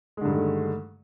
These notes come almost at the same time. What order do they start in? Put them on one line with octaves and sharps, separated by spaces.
G#3 D3 G2 D#3 A3